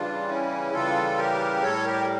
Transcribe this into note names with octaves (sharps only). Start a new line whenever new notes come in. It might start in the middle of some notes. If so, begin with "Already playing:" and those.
Already playing: C#3 E3 G3 D4 F4
C#4 E4
C#3 E3 G3 F4 A4
G4 A#4
A2 G3 A4 C#5
G4 A#4